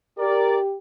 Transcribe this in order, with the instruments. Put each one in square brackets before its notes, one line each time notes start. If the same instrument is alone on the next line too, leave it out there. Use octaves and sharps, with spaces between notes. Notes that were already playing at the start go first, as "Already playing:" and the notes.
[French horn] G4 [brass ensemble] A#4 D5